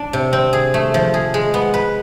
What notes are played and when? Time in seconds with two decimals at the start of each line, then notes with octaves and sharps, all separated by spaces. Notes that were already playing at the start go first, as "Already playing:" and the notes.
Already playing: D4
0.13 C3
0.33 C4
0.53 G#4
0.74 A3
0.94 F3
1.14 G#4
1.34 G#3
1.54 B3
1.74 B4